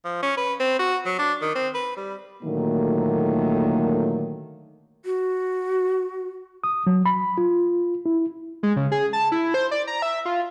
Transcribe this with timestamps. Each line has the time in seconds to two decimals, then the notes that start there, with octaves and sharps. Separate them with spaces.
0.05 F3
0.23 C#4
0.37 B4
0.60 C4
0.79 F#4
1.06 F#3
1.19 D4
1.42 D#3
1.55 C4
1.74 B4
1.97 G3
2.43 A#2 D3 D#3 F#3 A3 A#3
5.05 F#4
6.64 D#6
6.87 F#3
7.06 B5
7.38 F4
8.06 E4
8.63 G#3
8.76 C#3
8.92 G#4
9.13 A5
9.32 E4
9.54 C5
9.71 D5
9.87 A#5
10.02 E5
10.25 F4